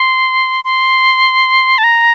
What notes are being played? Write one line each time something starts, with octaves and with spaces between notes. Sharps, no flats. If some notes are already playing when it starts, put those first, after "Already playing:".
Already playing: C6
C6
A5
A#5